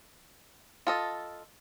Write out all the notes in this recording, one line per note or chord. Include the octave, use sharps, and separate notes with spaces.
F4 A4 D#5